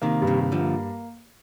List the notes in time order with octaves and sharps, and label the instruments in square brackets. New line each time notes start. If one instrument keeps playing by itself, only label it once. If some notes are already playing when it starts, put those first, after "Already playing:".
[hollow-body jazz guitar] C3 D#3 [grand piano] A#3
[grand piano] G2
[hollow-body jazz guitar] C3 D#3
[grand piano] G2
[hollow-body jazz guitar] D3 F3
[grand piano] A#3